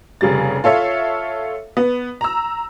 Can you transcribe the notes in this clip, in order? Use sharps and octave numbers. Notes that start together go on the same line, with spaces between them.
F1 C#3 G3 A6
F4 A4 C#5 E5 F5
B3
A#5 E6